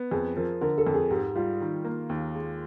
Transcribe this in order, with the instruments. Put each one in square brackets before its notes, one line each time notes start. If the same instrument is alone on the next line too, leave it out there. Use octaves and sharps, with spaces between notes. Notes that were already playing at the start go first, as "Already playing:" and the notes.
Already playing: [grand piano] B3
[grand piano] F2 [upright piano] G#4
[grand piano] F3 [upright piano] A#4
[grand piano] D3 [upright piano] A#4
[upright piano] A4
[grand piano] F2
[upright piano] G#4
[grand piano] G#2 [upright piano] G4
[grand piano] G3 [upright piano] F4
[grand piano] D#3
A#3
D#2
G#3